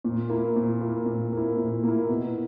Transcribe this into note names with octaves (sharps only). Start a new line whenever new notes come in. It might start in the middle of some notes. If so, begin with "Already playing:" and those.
A#2
A#3 E4
A#2
A#3 E4
A#2
A#3 E4
A#2
A#3 E4
B2